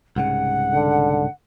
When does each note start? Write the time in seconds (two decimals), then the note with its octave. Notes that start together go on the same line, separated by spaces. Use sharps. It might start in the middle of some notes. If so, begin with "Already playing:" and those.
0.16 C2 G#2 C#3 F#5
0.73 D3